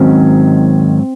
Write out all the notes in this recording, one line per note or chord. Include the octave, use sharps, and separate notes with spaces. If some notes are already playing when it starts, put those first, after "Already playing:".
Already playing: G#2 D#3 F#3 C4 C#4